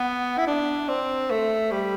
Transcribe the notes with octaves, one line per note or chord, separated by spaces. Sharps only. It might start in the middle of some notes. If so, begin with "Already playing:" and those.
Already playing: B3
E4
D4
C4
A3
G3